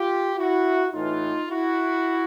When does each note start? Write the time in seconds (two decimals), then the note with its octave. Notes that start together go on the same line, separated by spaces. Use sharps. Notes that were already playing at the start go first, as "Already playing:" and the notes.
Already playing: F4 G4
0.37 E4 F#4
0.93 A2 E3 D#4 F4
1.49 E4 F#4